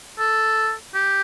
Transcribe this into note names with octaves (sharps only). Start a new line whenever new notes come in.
A4
G4